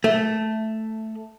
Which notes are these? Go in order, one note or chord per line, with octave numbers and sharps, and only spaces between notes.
A3